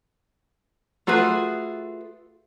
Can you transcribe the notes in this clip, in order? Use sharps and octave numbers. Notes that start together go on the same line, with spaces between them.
A3 F4 F#4 G#4 B4